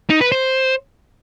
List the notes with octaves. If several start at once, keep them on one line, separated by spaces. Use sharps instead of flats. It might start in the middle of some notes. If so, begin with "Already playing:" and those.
D#4
B4
C5